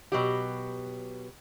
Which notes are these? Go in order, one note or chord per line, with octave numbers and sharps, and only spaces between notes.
B2 F#3 G4